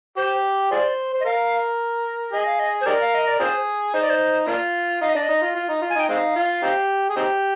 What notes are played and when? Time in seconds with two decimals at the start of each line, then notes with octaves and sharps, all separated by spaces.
0.17 G4 C5
0.71 F4 G#4 C5 D5
1.14 C5
1.20 D#5
1.25 A#4 F5
2.33 G#4 D#5
2.46 F5
2.59 D#5
2.81 C5
2.86 D#4 G4 A#4 D5
3.01 F5
3.14 D#5
3.27 D5
3.40 C4 F4 G#4 C5
3.94 D#4 C5
4.02 D5
4.10 C5
4.48 A#3 D4 F4
5.02 D#4 F5
5.09 D#5
5.15 D4 D5
5.23 D#5
5.29 D#4
5.42 F4
5.56 F4
5.69 D#4
5.82 F4
5.90 G#5
5.96 D#4 G5
6.09 G#3 C4 D#4 F5
6.36 F4
6.63 C4 D#4 G4
7.10 G#4
7.17 C4 D#4 G4